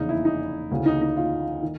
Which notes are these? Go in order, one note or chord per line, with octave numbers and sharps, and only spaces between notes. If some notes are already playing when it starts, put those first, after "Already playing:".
Already playing: F1 E2 C#3 E3 D#4
E4
D#4
D2 C#3 E3
D#4
D#4
F4
D#3